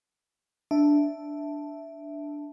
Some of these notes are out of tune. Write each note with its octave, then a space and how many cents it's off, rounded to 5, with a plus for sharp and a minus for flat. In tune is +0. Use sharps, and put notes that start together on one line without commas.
D4 +0 E5 +0 A5 +0